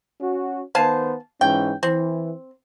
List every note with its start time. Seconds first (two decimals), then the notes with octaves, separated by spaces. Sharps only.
0.21 C#4 F#4
0.75 D#3 B3 C5 F5 G#5 A5
1.41 G#2 E3 C#4 G5
1.83 E3 C4